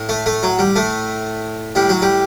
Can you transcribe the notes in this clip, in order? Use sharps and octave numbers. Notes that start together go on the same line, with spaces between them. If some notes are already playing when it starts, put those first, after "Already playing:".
Already playing: A2
A3
A3
F#3
G3
A2 A3
A2 G3
F#3
G3